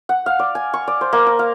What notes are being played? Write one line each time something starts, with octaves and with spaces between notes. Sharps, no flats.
F#5
F5
D5
G#5
C#6
D5
C5
A#3
A#5
F5